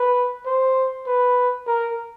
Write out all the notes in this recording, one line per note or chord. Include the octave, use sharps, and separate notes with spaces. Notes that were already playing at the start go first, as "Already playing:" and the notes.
Already playing: B4
C5
B4
A#4